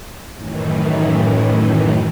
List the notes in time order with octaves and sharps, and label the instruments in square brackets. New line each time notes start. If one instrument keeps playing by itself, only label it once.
[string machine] F#2 A2 D#3 E3